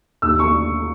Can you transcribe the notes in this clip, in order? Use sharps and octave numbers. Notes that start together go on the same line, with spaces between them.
D#2 E6
B3 C#6